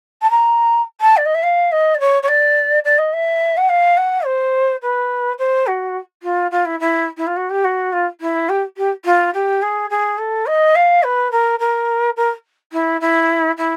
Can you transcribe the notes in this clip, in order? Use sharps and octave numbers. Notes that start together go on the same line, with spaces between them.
A5
A#5
A5
D5
D#5
E5
F5
D#5
D5
C#5
C#5
D5
D5
D#5
E5
F#5
F5
F#5
C5
B4
C5
F#4
F4
F4
E4
E4
E4
F4
F#4
G4
F#4
F4
E4
G4
G4
F4
G4
G#4
G#4
A4
D#5
F5
B4
A#4
A#4
A#4
E4
E4
E4